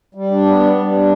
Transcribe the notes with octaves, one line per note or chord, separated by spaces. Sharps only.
G3
D4
B3
G3
G3
D4